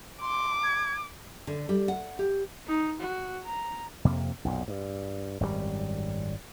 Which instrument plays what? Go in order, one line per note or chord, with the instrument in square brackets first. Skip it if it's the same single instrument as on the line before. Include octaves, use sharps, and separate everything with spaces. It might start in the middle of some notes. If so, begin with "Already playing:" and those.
[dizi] C6 [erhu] D6
[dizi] G#6
[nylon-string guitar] D3
G3
F#5
G4
[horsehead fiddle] D#4
F#4
A#5
[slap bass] F2 C3 A#3
B1 F2 A#2
G2
G#1 F#2 A2 G3